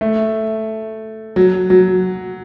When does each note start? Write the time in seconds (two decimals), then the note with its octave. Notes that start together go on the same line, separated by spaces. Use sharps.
0.01 A3
1.36 F#3
1.70 F#3